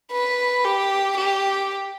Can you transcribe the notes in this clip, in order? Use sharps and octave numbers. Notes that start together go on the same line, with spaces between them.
B4
G4
G4